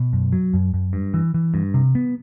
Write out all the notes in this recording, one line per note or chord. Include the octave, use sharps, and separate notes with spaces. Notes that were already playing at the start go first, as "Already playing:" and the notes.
Already playing: B2
F#2
F#3
F#2
F#2
G2
E3
E3
G2
C3
B3